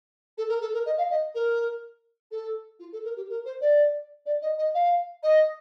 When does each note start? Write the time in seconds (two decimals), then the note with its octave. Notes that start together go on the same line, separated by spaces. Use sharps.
0.37 A4
0.49 A#4
0.61 A4
0.73 A#4
0.86 D#5
0.97 F5
1.10 D#5
1.34 A#4
2.31 A4
2.79 F4
2.92 A4
3.04 A#4
3.16 G4
3.29 A#4
3.45 C5
3.61 D5
4.26 D5
4.42 D#5
4.58 D#5
4.74 F5
5.23 D#5